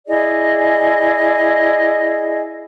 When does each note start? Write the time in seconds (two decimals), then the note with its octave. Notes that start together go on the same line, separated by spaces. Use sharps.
0.07 E4 G#4 D5 D#5